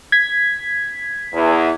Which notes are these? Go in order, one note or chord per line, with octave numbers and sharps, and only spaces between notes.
G#6 B6
E2